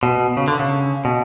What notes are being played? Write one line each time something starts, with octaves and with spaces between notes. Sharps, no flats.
B2
C#3
D3
C#3
B2